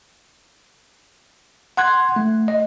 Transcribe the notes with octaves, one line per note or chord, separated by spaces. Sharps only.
F#5 C6 F#6 G#6
A3
D#5